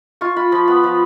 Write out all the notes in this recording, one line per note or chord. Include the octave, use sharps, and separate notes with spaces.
F4 C#6
F4 B5
F3 B5
B3 B5
F3